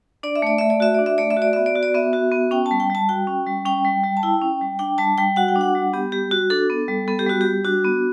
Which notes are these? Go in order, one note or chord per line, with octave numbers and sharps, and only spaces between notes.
D4 D5
E5
A3 D5
A3 E5
D5
F#4 E5
D4 D5
E5
A3 D5
E5
F#4
D5
B3 E5
D5
F#4
D5
B3 E5
F#4
B3
C#4 G5
A5
G3
G5
G3 A5
F#4 G5
C#4
G3
C#4 G5
G3
G3
A5
E4 G5
C#4
G3
D4 G5
G3 A5
G3 G5
F#4 F#5
G5
D4
F#5
G3
B3 G4
G3 G4
F#4
D4 A4
B3
G3
B3 A4
G4
G3 F#4
G3 G4
D4 F#4
B3